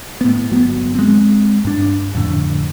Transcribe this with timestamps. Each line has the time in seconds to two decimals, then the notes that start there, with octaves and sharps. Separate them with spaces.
0.21 A2 B3
0.50 G1 F#3 B3
0.95 G#3 C4
1.65 G2 D4
2.15 F2 A2 D3 D4